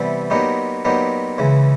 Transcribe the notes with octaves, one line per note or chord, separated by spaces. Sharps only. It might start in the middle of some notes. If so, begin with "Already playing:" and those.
Already playing: C3 E3 G3 B3
A#2 F#3 B3 D#4 G4
A#2 F#3 B3 D#4 G4
C#2 C#3 E3